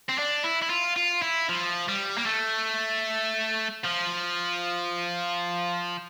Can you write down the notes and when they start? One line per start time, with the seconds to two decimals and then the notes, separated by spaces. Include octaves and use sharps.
0.09 C4
0.18 D4
0.44 E4
0.62 E4
0.70 F4
0.96 F4
1.22 E4
1.49 F3
1.88 G3
2.18 A#3
2.26 A3
3.84 F3